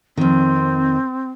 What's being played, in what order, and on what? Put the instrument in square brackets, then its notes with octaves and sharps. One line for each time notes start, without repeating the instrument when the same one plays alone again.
[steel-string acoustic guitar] F2 D#3 [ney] C4